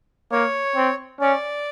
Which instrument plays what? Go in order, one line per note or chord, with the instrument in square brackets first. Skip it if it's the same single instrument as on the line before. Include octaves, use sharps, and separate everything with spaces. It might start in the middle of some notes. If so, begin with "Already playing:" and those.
[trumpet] A#3 [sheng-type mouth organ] C#5
[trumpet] C4
[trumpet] C#4 [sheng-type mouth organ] D5